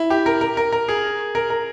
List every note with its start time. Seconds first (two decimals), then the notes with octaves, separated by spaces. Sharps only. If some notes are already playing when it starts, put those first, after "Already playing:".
Already playing: E4
0.10 G4
0.26 A#4
0.41 A#4
0.57 A#4
0.72 A#4
0.88 G#4
1.35 A#4
1.50 A#4